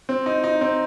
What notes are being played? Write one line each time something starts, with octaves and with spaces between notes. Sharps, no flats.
C4
D#4
D#4
C4